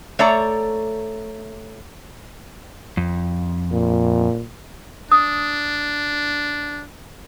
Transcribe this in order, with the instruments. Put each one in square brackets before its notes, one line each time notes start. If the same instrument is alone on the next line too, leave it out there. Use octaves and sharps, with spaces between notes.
[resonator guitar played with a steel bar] A3 A4 C#5 D5 A#5
[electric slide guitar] F2
[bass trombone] A#2
[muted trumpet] D4 [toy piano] D#6